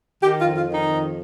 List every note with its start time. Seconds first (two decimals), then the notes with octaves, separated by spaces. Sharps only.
0.21 D#3 G4
0.39 F4
0.45 F2
0.56 F4
0.67 D#3
0.72 D#4
0.89 F2